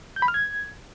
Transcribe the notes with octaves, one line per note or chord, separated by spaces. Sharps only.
G6
B5
F6
G#6